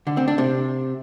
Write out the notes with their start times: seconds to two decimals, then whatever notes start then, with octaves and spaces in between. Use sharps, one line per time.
0.07 D3
0.17 C4
0.28 D4
0.38 C3